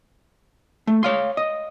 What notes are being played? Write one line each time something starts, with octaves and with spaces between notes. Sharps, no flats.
A3
C#5 F5 C6
D#5